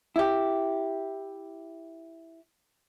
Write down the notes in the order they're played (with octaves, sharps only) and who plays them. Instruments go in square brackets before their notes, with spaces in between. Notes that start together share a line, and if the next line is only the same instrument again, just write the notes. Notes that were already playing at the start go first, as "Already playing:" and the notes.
[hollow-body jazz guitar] E4 G4